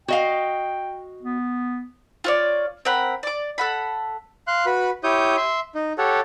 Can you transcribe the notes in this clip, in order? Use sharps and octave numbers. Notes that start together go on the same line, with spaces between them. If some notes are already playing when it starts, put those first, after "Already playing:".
F#4 D#5 F5 G5
B3
F4 C#5 D5
C4 A#4 F#5 B5
D5 D6
A4 F#5 B5
F5 C6 F#6
F#4 B4 B5
E4 G4 C#5 D#6 G6
E5 C6
D#4
G4 A4 C#5 F#5